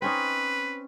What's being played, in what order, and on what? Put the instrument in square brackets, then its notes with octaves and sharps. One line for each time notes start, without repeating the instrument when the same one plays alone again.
[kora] C4 C#4 D#4 [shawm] B4